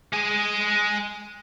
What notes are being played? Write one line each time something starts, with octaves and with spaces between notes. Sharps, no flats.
G#3 G#4